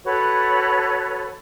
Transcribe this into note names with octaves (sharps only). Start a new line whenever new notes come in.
F#4 A4 B4 C#5